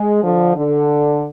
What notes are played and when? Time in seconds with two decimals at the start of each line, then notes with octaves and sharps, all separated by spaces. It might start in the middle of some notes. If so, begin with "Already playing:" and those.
Already playing: G#3
0.23 D3 F3
0.56 D3